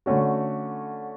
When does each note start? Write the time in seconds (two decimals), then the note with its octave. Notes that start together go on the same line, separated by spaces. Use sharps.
0.06 D3 A3 C#4 F#4